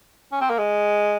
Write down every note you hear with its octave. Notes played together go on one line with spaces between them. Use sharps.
C#4
C4
A#3
G#3